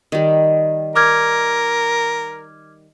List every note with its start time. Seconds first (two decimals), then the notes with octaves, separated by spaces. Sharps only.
0.12 D#3 G3
0.96 A#4 D6 F6 G#6